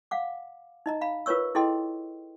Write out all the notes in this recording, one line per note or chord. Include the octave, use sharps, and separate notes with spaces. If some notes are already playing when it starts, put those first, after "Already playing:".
F5 F#5 D6
D#4 D#5 A#5
F5 B5
F4 A#4 B4 C#5 C#6 E6
E4 G#4 A4 D#5 G5 C6